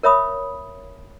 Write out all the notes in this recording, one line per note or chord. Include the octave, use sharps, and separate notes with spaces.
A#4 C#5 E5 B5 D#6